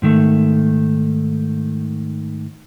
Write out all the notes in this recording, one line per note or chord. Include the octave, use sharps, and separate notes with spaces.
G#2 D#3 A3